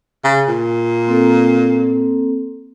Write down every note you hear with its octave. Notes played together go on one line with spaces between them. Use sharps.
C#3
A#2
A#3 C4 A4